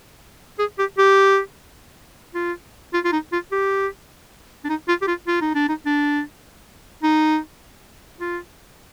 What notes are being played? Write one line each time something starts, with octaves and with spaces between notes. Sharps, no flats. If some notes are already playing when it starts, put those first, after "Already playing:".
G#4
G4
G4
F4
F4
F4
D#4
F4
G4
D4
D#4
F4
G4
F4
F4
D#4
D4
D#4
D4
D#4
F4